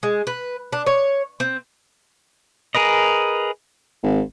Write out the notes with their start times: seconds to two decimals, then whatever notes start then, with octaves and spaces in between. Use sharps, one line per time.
0.03 G#3
0.27 B4
0.73 D4
0.87 C#5
1.40 C4
2.75 G#4 A#4 B4 D#5
4.03 G#1